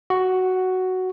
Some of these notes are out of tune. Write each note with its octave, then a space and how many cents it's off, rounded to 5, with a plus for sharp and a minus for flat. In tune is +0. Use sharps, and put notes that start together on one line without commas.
F#4 +5